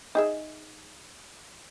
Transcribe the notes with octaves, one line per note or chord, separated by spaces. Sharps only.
D#4 G#4 E5